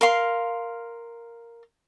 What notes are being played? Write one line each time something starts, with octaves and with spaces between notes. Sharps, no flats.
A#4 F5 C6